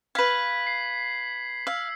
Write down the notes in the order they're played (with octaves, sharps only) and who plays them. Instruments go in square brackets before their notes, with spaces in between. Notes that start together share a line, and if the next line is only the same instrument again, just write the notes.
[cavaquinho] B4 F5 [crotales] G#6 B6 F#7
[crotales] C7
[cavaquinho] F5 [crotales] E6